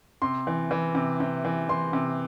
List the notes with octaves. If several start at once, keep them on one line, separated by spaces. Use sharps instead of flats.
C3 C6
E3
E3
C3
C3
E3
E3 C6
C3